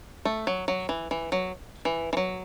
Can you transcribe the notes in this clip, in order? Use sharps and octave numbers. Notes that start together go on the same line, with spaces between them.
A3
F#3
F#3
E3
E3
F#3
E3
E3
F#3